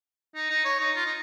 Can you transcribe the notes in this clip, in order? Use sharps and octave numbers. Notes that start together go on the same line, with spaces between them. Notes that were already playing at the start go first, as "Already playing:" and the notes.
D#4
D#4
C#5
D#4
F4
D#4